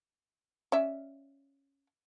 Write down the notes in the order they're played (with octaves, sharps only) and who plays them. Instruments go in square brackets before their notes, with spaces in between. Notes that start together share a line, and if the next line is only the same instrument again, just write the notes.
[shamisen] C#4 D5 E5